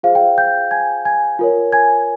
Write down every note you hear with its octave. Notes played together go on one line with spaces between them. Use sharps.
F4 G#4 C5 F5
G5
G5 G6
G#5 G#6
G#5 G#6
F4 A#4 C#5
G#5 G#6